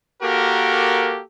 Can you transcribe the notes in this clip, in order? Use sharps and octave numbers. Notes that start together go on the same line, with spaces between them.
A#3 F#4 G4 A4 A#4